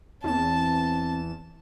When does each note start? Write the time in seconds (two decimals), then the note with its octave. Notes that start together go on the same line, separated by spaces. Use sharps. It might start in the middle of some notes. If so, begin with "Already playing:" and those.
0.24 E2 C4 A5 E7